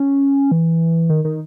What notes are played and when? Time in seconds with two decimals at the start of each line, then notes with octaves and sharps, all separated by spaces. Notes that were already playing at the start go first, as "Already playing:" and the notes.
Already playing: C#4
0.51 E3
1.09 D#3
1.25 D#3